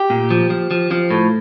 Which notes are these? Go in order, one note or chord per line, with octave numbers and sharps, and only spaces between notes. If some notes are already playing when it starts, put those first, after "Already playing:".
Already playing: G4
A#2
F3
F3
F3
F3
A2